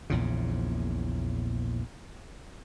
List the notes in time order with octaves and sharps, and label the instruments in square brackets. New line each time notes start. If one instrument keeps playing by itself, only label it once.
[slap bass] A#1 E2 A#2 C#3